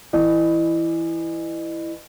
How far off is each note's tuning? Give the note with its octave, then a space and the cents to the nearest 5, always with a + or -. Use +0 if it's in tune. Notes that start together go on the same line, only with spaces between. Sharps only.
E3 +5 D#5 -40